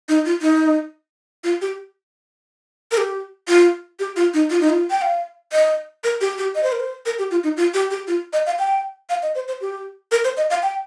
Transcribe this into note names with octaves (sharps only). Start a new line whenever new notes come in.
D#4
F4
D#4
F4
G4
A#4
G4
F4
G4
F4
D#4
F4
D#4
F4
G5
F5
D#5
A#4
G4
G4
D#5
C5
A#4
C5
A#4
G4
F4
D#4
F4
G4
G4
F4
D#5
F5
G5
F5
D#5
C5
C5
G4
A#4
C5
D#5
F5
G5